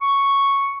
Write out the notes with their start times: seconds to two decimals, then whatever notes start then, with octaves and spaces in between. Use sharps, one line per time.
0.01 C#6